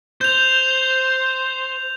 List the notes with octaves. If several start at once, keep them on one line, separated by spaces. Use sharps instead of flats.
C5 G6 F7